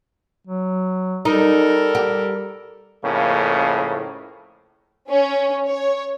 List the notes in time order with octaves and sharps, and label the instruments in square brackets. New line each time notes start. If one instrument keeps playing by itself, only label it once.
[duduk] F#3
[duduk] G3 [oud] D#4 [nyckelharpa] A4 A#4
[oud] G4
[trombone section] F2 A2 C#3 A#3
[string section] C#4
C#5